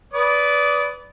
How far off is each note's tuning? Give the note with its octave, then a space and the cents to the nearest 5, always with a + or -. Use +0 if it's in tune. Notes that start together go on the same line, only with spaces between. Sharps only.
B4 +0 D5 -20 D#6 +0